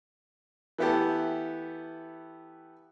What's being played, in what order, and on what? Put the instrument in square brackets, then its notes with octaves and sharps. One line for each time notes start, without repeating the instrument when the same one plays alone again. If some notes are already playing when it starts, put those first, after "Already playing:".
[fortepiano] E3 A3 B3 E4 G4 A4